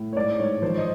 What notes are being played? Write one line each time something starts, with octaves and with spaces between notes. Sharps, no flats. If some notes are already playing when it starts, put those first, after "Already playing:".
Already playing: A2
C#5
G#2 D5
G#2 C#5
F3 C5
D#5